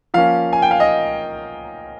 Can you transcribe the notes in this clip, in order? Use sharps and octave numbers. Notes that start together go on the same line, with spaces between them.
F3 A#3 C#4 F5
G#5
G5
F5
D#5